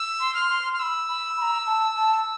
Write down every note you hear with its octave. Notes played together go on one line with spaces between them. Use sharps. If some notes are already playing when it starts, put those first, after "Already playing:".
Already playing: E6
C6
F6
C6
F6
B5 C6 E6
B5
B5
A#5
A5
A5